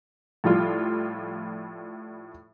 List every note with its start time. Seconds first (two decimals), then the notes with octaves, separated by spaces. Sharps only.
0.44 A2 F3 G3 F4